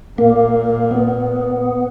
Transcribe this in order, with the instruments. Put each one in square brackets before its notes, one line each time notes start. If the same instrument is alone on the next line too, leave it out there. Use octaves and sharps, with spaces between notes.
[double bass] A#2 [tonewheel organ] A#3
[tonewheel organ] B3